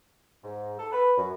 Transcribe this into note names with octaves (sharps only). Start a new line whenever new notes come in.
G#2
A4
B4
F#2